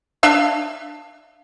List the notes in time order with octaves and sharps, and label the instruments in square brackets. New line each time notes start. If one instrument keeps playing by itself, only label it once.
[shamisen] D4 E5 F5